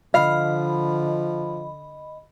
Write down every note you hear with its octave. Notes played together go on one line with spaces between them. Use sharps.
D3 F3 D#5 F5 B5